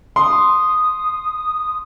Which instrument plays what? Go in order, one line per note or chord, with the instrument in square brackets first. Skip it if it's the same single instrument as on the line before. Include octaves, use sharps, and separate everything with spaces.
[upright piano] C6 [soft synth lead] D#6